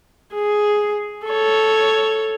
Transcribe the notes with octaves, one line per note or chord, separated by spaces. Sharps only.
G#4
A4 C#5